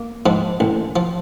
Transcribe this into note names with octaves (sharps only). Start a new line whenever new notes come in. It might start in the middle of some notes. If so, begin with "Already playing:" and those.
Already playing: A#3
G#2 F3
A1
F3